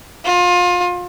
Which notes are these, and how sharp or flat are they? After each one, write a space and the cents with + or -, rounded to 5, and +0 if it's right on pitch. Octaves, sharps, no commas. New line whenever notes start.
F4 +30